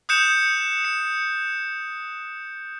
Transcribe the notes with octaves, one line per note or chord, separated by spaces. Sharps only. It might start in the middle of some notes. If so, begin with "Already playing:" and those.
D#6 F#6 G6 C#7 E7
C#7